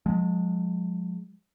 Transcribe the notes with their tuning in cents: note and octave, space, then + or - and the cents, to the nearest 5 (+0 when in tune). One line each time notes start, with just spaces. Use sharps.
F3 +40 G#3 +0